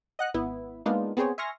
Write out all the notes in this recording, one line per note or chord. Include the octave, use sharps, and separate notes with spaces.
D#5 F#5 F#6
G#1 B3 E4
G#3 A#3 B3 D4 D#4 F4
B3 C4 G#4 C5 C#5
E5 G#5 C6 C#6 F6 A#6